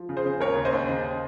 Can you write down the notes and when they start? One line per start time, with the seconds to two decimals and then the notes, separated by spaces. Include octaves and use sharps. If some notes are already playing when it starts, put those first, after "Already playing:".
Already playing: F3
0.09 C#3
0.17 G#4 C5
0.25 C#3
0.40 D#2 A#4 C#5
0.57 C#3
0.65 C5 D#5
0.73 D#2
0.89 C#3